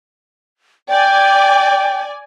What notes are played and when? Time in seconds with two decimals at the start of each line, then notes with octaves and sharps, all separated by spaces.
0.89 D5 G5 G#5